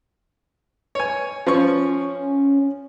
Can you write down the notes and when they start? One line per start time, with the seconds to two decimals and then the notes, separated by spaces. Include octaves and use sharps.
0.95 C#5 G#5
1.47 F3 C#4 C#6